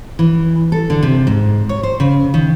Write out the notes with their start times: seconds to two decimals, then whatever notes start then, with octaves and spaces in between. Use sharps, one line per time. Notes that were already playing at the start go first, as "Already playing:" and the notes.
0.19 E3
0.72 A4
0.90 D3
1.03 C3
1.27 G#2
1.69 C#5
1.83 C5
2.00 C#3
2.34 D#3